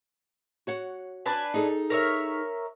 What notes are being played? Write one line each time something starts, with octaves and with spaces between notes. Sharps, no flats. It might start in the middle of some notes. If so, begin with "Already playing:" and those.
F#4 C#5 F#5
D4 B4 G#5
D#4 G#4 A4
A#4 C#5 E5